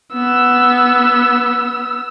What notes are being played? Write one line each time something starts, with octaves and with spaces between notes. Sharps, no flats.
B3 E6